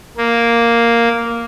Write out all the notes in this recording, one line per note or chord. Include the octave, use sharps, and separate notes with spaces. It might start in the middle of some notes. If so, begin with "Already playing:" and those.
A#3